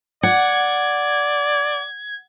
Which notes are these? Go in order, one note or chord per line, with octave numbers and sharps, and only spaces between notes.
D5 F#5 G#6